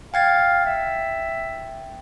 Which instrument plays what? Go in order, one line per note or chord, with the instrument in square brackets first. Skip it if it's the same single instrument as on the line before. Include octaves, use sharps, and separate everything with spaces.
[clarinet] F5 [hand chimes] G5 G#6 A6
[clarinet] E5